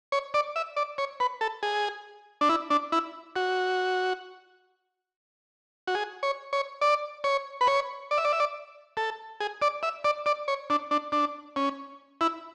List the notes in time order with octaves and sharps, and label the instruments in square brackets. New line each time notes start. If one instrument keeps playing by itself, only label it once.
[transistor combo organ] C#5
D5
E5
D5
C#5
B4
A4
G#4
D4
E4
D4
E4
F#4
F#4
G#4
C#5
C#5
D5
C#5
B4
C#5
D5
E5
D5
E5
D5
A4
G#4
D5
E5
D5
D5
C#5
D4
D4
D4
C#4
E4